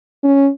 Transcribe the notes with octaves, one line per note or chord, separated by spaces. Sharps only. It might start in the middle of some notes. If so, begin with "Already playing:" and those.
C#4